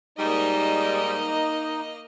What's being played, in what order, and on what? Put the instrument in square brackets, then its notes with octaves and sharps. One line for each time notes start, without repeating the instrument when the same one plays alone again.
[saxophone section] G#2 G3 [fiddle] A#3 D#5 [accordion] D#4